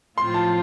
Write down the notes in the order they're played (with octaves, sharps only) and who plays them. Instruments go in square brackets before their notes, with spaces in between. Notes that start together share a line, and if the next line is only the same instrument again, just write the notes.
[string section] A2 F3 C4 F4 [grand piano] C6
[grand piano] A5